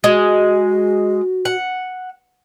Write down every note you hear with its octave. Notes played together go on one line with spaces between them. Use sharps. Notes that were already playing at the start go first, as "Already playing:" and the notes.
G#3 F#4
F#5